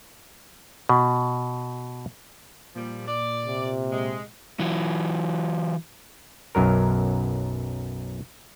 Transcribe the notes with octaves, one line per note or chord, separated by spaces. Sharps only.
B2
A#2 F3 G3
D5
C3
G#3
E3 F#3
B1 F#2 F#3 A#4